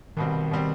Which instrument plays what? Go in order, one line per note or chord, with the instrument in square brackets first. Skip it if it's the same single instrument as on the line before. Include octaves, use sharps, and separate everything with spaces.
[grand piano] C2 B2 G3 C4 [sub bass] D#3
[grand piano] B2 G3 C4